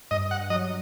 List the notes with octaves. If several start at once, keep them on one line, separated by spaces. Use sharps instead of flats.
G2 D#5
F#5
F#3 D#5